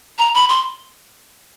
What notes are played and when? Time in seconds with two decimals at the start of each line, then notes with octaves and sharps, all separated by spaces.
0.19 A#5
0.34 B5
0.49 C6